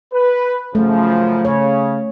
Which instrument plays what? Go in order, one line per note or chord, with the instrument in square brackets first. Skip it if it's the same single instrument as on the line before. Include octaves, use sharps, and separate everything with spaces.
[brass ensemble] B4
[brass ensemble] F#2 C#3 F3 [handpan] A3
[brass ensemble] C#3 [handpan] C#5